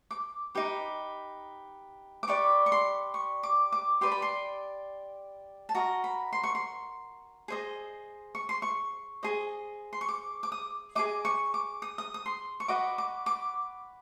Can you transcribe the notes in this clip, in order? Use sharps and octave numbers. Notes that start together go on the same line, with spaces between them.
D6
D#4 G4 B4
D6
G4 B4 D5 C#6
C#6
C6
C#6
D6
D6
G4 B4 D5 C6
B5
C6
A5
F#4 A#4 D#5 A#5
B5
C6
C#6
C6
G#4 C5 D#5
C#6
C6
C#6
G#4 C5 D#5
C6
C#6
D6
D6
D#6
G#4 C5 D#5 D6
C#6
D6
D#6
D#6
D#6
C6
C#6
F#4 B4 D#5 D6
D6
D6